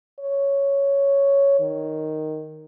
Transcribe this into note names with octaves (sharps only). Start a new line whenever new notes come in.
C#5
D#3